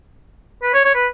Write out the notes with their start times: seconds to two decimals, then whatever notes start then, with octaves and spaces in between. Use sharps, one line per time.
0.63 B4
0.74 C#5
0.85 C#5
0.95 B4